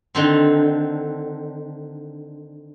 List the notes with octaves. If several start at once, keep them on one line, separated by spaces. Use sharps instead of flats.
D3 D#3 C4